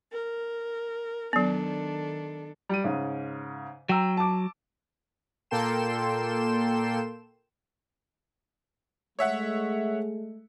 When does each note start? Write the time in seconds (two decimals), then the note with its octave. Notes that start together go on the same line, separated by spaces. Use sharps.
0.12 A#4
1.33 D#3 F#3 B3 D4 A4
2.69 G3 D#7
2.84 G#2 C#3
3.89 F#3 G5 A#5 E6
4.17 A5 D6
5.51 A#2 A#3 A4 G5 C6 E7
9.19 G#3 A3 C#5 E5 F#5